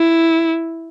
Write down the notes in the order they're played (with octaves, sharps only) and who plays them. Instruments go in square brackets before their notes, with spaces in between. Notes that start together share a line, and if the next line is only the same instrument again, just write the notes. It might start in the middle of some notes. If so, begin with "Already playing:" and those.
Already playing: [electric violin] E4